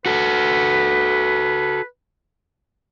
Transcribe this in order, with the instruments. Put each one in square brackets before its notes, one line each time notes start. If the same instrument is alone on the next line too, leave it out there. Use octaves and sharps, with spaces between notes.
[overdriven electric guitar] F#4 A4 [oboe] B4